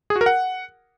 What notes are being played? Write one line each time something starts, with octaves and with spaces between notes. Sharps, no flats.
G#4
F#4
A#4
F#5